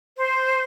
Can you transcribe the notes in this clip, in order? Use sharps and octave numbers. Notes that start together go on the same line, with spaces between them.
C5